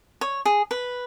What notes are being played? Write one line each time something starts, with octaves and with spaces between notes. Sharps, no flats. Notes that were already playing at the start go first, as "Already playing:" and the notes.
C#5
G#4
B4